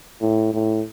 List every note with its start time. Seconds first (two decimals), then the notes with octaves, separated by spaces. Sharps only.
0.21 A2
0.53 A2